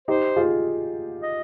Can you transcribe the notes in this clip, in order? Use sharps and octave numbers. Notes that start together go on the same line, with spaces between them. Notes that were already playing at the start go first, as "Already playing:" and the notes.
D#4 G4 C5
F4 G#4
D#5